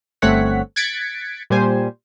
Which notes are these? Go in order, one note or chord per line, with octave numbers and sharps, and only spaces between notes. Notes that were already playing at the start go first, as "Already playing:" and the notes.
G1 A3 C4 C#5 F#5 B6
F#6 G#6 A6 B6 C#7 D7
A#2 G3 G4 C5 G#5